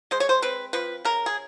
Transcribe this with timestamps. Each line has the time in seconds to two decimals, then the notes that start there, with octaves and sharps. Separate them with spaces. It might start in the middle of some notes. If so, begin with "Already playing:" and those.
0.11 G#3 C5
0.20 C#5
0.29 C5
0.42 C4 B4
0.73 F3 B4
1.05 C#3 A#4
1.26 G#4